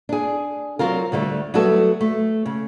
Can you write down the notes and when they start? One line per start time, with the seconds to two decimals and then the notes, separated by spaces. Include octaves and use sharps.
0.09 D4 G#4
0.79 F#3 C4 F4 A#4
1.12 D2 D3 G3 A3
1.54 F#3 G3 A3 B3 F#4 A4
2.01 A3
2.46 C#3